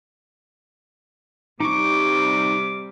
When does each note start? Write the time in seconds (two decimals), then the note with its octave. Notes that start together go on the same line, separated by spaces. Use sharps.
1.60 C3 G3 D#4 C#6 D6